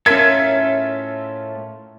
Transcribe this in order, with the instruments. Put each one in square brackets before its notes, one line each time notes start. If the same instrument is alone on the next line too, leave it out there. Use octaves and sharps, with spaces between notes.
[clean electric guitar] A2 F4 A4 [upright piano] C#4 A#4 [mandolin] E5 [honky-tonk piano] G#6 B6